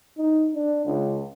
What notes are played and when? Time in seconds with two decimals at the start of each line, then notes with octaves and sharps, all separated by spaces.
0.18 D#4
0.54 D4
0.85 C#2